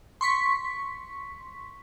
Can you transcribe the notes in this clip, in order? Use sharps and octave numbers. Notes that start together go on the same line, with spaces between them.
C6 C#6 B6